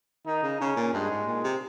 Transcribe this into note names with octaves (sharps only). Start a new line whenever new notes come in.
D#3 D#4
C#3
C#3 C#4
A#2
G2 G#3
G#2
A#2
C3